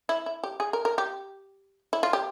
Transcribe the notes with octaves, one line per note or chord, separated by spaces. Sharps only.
E4
E4
G4
G#4
A#4
A#4
G4
E4
F4
G4